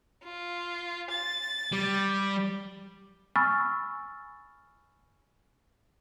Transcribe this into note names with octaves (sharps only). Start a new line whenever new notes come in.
F4
A6
G3
G#5 B5 C#6 E6 F6 A6